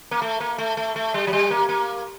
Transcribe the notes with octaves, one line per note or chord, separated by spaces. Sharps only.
A#3
A3
A#3
A3
A3
A3
G3
F#3
G3
A#3
A#3